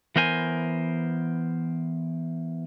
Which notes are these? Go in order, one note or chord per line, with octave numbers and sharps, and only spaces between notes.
E3 B3 A#4 C5 G#5